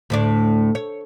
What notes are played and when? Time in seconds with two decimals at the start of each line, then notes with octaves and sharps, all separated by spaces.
0.10 D2 A2 D4
0.75 C#5